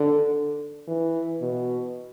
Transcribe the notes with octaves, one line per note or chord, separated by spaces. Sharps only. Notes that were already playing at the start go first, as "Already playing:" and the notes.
Already playing: D3
E3
B2